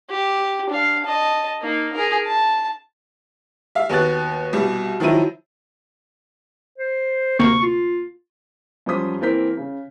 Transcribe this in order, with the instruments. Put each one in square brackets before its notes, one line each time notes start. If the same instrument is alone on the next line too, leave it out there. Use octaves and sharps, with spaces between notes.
[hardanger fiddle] G4
D4 F5
D#5 A5
A#3 D#4
G#4 A#4
A5
[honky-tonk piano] E5 F5
D#2 B3 F#4 F#6 A6
C2 B2 G3
D#3 F3 F#3 E4 D#7
[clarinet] C5
[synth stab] D2 C3 A#3 [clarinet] C#6
[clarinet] F4
[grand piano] F#2 F3 G3 C5 D#6 B6
E3 A#3 C4 A#4 G6 B6
C#3